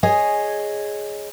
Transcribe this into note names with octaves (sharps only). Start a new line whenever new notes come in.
G#4 C#5 D#5 G#5